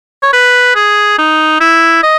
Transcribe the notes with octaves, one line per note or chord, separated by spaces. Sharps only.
C#5
B4
G#4
D#4
E4
D#5